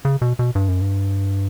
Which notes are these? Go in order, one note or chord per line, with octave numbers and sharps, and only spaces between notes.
C#3
B2
B2
G2
F#2
G2